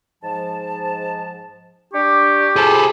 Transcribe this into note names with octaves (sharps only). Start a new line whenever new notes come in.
G#2 F3 A5
D4 G4 C#6
C3 F4 G#4 A4 B5